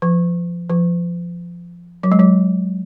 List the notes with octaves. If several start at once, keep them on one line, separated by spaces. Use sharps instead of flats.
F3
F3
F#3
G#3
F#3